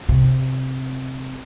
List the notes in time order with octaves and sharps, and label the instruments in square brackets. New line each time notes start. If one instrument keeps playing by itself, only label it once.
[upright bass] C3